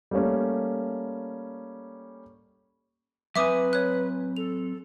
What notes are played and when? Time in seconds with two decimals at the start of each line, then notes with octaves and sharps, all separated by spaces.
0.11 G3 A3 A#3 C#4
3.36 F#3 C4 B4 E5 G#5 D6 D#6
3.73 C#5 F#6
4.37 A4 F7